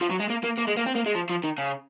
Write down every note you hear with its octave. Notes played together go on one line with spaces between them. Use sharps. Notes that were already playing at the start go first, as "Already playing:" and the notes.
F3
F#3
G#3
A#3
A#3
A#3
G#3
A#3
C4
A#3
G#3
F3
F3
D#3
C#3